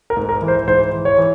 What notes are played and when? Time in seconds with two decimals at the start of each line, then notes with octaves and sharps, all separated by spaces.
0.10 A#4
0.17 G#2
0.29 A#4
0.42 E3
0.48 C5
0.67 G#2 C5
0.93 E3
1.05 C#5
1.18 E3